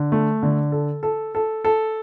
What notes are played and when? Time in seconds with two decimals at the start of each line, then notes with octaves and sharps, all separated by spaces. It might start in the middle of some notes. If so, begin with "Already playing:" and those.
Already playing: D3
0.12 A3
0.43 D3
0.72 A4
1.03 A4
1.35 A4
1.65 A4